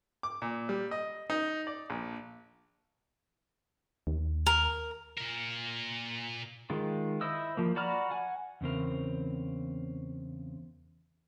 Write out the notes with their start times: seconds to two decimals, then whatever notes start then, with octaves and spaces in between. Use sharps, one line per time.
0.23 D6
0.42 A#2
0.69 G3
0.91 D#5
1.30 D#4
1.67 D5
1.90 A#1
4.07 D#2
4.46 A#4
5.18 A#2 A#4
6.70 D#3 G#3 F4
7.21 E4 C5 D#5 D#6 E6
7.57 F3 A#3
7.76 F#4 D5 A#5 B5 F6
8.11 F#5 G#5
8.61 E2 C#3 C4 A#4